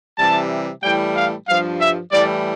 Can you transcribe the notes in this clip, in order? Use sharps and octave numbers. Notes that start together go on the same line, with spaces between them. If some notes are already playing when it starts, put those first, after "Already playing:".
C3 E3 G3 A5
A2 E3 G3 G5
F5
G2 F3 F5
E5
A2 E3 G3 D5